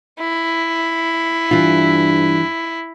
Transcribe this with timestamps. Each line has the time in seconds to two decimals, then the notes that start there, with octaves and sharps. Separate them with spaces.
0.20 E4
1.51 G2 E3 F4